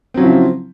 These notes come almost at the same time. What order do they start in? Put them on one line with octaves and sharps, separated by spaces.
C4 F#3 C#3 E4 F3